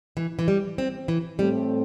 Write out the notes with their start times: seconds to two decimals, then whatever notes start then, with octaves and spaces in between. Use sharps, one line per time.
0.17 E3
0.39 E3
0.48 G3
0.78 C4
1.08 E3
1.39 A2 G3 A3 C4